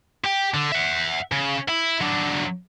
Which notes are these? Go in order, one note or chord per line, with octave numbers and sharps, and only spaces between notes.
G4 G5
D3
E5 F#5
C#3
E4
F#3 D4